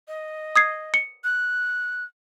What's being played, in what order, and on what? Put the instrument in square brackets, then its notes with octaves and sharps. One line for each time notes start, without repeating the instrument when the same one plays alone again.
[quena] D#5
[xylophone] D#6 G#6 C7
C#7
[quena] F#6